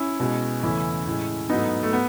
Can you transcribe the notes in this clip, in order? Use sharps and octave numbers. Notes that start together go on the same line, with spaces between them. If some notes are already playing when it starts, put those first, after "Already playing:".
Already playing: C#4 E4
B2 G#3
E2 C#3 E3 A3 C#4 E4
A2 G#3
G#2 F#3 A3 B3 D#4
A3
B3